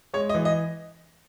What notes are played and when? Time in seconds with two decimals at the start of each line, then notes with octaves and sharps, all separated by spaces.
0.13 G#3 C#5
0.29 D#5
0.35 E3
0.45 D#5